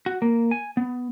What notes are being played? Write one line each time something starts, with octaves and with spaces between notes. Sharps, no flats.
F#4
A#3
G#5
B3